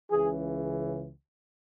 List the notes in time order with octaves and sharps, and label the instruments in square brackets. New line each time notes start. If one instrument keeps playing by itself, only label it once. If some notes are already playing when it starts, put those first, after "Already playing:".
[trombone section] C#2 C#3 E3 G#4